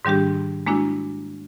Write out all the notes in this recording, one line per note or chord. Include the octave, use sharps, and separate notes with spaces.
G#2 D#3 G3 D4 G4
G#3 A#3 D4 E4 F#4